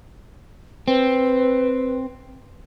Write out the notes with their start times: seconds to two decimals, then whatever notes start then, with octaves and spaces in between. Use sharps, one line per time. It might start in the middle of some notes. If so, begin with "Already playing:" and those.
0.88 C4 B4